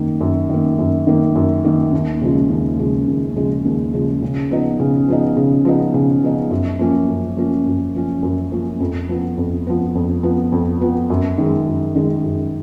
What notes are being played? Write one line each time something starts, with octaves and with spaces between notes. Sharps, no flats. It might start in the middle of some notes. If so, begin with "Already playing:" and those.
Already playing: F#2 D#3 A#3
F#2
D#3 A#3
F#2
D#3 A#3
F#2
D#3 A#3
D#2
C#3 F3 G#3
D#2
C#3 F3 G#3
D#2
C#3 F3 G#3
D#2
C#3 F3 G#3
C#3
F3 B3 D#4
C#3
F3 B3 D#4
C#3
F3 B3 D#4
C#3
F3 B3 D#4
F#2
F3 A#3 C#4
F#2
F3 A#3 C#4
F#2
F3 A#3 C#4
F#2
F3 A#3 C#4
F2
F3 B3
F2
F3 B3
F2
F3 B3
F2
F3 B3
F#2
D#3 G#3
F#2
D#3 G#3
F#2